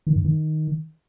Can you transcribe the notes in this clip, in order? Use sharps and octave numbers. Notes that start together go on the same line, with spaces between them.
D#3
G2
D#3